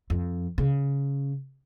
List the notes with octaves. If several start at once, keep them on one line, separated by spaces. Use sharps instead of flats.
F2
C#3